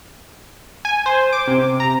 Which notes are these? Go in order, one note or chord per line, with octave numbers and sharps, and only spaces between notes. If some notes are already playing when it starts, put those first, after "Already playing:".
G#5
C5
D6
C3
A#5